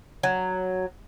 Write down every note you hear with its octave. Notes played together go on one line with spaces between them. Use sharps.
F#3